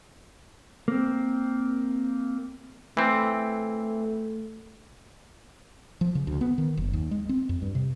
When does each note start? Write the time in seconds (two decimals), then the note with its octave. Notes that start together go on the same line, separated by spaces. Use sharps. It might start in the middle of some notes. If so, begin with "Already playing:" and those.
0.88 A#3 C4
2.97 E3 A3 C4
6.01 F3
6.15 C#3
6.27 D2
6.41 B3
6.58 D#3
6.77 F#1
6.93 D#2
7.11 G#3
7.29 C4
7.49 F2
7.62 G2
7.75 C3